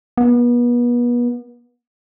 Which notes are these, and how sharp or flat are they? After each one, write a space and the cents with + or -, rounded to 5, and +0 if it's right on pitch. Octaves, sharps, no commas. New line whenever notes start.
B3 -35